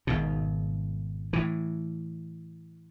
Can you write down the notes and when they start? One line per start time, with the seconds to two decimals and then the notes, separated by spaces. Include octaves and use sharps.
0.07 G#1 G#2 B2
1.33 A2 E3